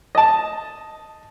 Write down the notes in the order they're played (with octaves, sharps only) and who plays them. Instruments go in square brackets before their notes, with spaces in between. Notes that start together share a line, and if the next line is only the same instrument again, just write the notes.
[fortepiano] D#5 A5